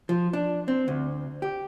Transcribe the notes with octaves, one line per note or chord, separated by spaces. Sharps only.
F3
D4
C4
D2
G4